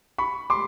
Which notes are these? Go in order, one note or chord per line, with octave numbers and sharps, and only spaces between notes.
B5 C#6
C6 D6